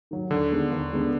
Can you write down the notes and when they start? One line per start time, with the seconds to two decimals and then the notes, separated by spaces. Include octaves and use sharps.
0.11 D#3 F#3
0.31 D#2 D3
0.51 D#3 G#3 B3 D4
0.72 D#2
0.92 D#3 G#3 B3 D4